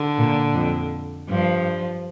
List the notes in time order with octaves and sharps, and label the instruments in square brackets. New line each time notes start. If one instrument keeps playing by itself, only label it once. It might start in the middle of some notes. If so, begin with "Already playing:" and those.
Already playing: [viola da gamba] D3
[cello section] A#2
F2
[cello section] G2 [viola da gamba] F3